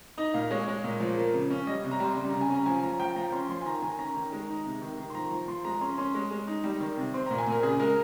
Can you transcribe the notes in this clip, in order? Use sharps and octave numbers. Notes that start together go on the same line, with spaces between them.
D#4 D#5
A#2 F5
G#3 C#5
G#3
A#2
F3
A#3
C#3
C#4
G3 D#5
C3
A#5
G3 C6
C#3
C#3 A#5
G#5
C#4
A#5
F3 G#5
F3 A#5
F3 G5
F3 A#5
C#4 C6
F3 C6
G#5
D#3 A#5
D#3 G#5
C#4 A#5
D#3
G#3
D#4
C3
D#3
D#3
C6
F3 A#5
F3
F3 C6
G#3 A#5
C#4 C6
C#4 C6
G#3
G#3
D#4
G3
D#3
C3
C4 C6
A#2 A#5
G#5
A#2 A#4
C#3 G#4
G#3 A#4